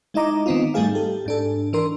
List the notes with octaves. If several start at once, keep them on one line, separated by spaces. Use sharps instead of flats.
G#3 D#4 E4 D#5 A#5 D6
D#3 B3 C4 D#4 F4
G#2 G3 A3 D#4 G#4 F5
G4 A4
G#2 D4 A4
E3 D4 A#4 C6